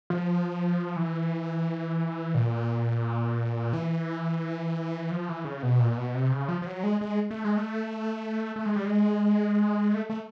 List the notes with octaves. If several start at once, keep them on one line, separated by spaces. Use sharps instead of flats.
F3
E3
A#2
E3
F3
E3
C#3
B2
A#2
B2
C3
C#3
F3
F3
F#3
G#3
G#3
A3
G#3
A3
A3
G#3
G3
G#3
A3
A3